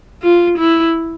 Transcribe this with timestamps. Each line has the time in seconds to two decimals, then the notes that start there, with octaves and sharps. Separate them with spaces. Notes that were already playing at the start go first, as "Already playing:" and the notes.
0.23 F4
0.59 E4